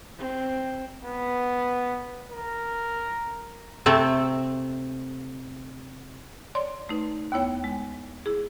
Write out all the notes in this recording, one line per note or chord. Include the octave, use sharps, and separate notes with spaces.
C4
B3
A#4
C3 A3 C4
C#5 D5 C6
A3 D#4 B4
D#2 B3 E4 C#5 G5
G#3
E4 G#4